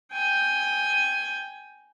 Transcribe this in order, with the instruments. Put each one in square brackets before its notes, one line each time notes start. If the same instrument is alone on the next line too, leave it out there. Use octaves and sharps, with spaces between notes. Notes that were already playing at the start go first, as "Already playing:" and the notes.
[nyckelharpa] G5 G#5